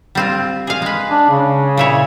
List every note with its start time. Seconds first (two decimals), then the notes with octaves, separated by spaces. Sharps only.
0.15 G3 C4 F4
0.67 G#4 F5
0.82 G#3 B4
1.10 D4
1.30 C#3
1.78 A#2 E4 C#5